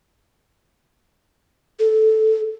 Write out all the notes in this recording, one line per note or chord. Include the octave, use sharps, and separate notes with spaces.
A4